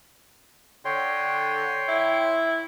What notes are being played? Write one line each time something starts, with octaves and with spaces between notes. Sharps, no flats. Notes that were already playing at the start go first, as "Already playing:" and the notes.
D3 C#5 G5 C6
E4